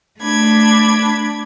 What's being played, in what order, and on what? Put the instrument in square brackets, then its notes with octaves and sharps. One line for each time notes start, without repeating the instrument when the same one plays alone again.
[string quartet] A3 D4 B5 G#6